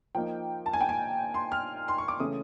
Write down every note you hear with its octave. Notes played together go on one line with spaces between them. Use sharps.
F3 A#3 D#4 G5
A5
G#5
G5
G#5
C6
F6
C6
C#6
D6
C#3 E3 A3 C#4 D#6